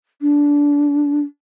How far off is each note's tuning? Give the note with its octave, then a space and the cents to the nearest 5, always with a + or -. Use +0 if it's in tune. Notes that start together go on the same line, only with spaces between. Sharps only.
D4 -20